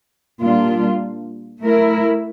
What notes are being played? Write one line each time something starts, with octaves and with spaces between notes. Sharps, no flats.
A#2 G3 D4 F4
A3 E4 A#4